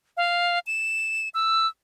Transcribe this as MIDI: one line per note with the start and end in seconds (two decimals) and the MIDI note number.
0.17 0.59 77
0.67 1.29 100
1.34 1.67 88